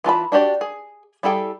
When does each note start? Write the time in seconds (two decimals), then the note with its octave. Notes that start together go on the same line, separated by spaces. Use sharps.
0.04 E3 F4 A5 B5
0.32 D4 F#4 G4 D5
0.61 G#4
1.23 G3 E4 G#4 A4 G5